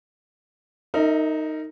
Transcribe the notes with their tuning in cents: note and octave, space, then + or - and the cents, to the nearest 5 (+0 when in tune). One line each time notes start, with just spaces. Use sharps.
D#4 +0 A#4 -30 E5 -30